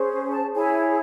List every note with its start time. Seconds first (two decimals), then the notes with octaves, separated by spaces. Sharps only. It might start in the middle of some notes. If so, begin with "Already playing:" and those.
Already playing: C#4 G#4 C5
0.31 A5
0.54 E4 G#4 C#5 G#5